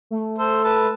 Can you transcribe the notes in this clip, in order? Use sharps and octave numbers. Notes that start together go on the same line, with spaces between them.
A3
A4 C5
B4 A5